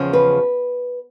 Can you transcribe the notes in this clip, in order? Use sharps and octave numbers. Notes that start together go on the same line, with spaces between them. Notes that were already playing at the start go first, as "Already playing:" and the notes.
Already playing: E2 C#3 F3
B4